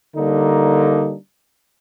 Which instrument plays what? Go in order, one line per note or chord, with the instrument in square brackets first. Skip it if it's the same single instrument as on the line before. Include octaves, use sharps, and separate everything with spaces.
[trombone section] D3 G3 A#3 D4 D#4